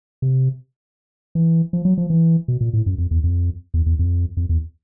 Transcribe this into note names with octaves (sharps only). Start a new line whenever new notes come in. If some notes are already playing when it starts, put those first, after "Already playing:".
C3
E3
F3
F#3
F3
E3
B2
A#2
A2
F#2
F2
E2
F2
E2
E2
F2
F2
E2